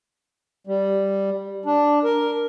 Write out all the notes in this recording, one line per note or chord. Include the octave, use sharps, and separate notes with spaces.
G3
D4
A#4